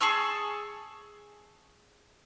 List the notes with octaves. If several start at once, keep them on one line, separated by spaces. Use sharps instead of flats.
G#4 A5 C#6 E6